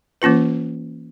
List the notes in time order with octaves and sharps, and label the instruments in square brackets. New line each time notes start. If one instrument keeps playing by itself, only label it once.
[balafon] E3 A#3 C#4 F4 B4